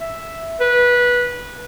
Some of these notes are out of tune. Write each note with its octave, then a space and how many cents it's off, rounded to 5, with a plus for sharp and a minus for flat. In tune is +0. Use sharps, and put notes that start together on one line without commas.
E5 +0
B4 -15